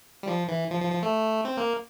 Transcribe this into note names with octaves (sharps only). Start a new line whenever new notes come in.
G3
F3
E3
F3
F3
F3
A3
C4
A#3